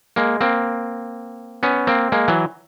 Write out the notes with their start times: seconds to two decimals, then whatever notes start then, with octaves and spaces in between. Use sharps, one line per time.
0.16 G#3 A#3
0.41 A#3 C4
1.63 B3 C#4
1.87 A#3 C4
2.12 G#3 A#3
2.28 E3 F#3